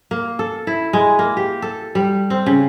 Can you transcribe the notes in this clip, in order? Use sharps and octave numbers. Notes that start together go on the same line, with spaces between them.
A#3
A4
E4
G#3
A#3
G4
A4
G3
C4
C#3